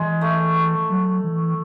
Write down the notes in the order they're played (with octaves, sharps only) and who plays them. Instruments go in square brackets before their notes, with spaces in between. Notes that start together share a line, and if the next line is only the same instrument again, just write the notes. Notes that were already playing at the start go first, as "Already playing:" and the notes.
Already playing: [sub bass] E3 [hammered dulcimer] G#3
[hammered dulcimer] A3
[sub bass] F#3
E3